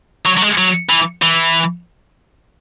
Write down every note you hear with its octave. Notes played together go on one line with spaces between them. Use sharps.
F#3
F#3
G#3
F#3
E3
E3